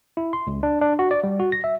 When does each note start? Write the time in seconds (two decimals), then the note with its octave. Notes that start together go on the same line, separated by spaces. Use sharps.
0.17 E4
0.33 C6
0.47 C#2
0.63 D4
0.81 D4
0.99 F#4
1.11 D5
1.24 G3
1.40 F#4
1.52 A#6
1.64 E5